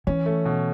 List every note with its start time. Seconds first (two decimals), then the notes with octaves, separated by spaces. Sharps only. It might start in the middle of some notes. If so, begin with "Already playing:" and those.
0.07 E3 C#4
0.26 A3
0.45 B2